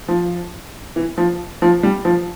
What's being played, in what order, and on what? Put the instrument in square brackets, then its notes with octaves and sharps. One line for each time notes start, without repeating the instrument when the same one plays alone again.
[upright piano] F3
E3
F3
F3
G3
F3